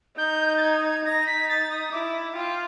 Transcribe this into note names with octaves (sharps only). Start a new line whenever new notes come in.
D#4 G6
A6
G#6
D#4 A#6
B6
A6
D#6
E4 D6
F4 G5